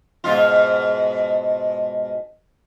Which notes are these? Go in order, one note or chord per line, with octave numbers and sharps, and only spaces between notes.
G#2 B2 F4